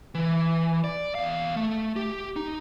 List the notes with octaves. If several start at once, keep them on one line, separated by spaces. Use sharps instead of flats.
E3
D5
E2 F5
A3
G4
D#4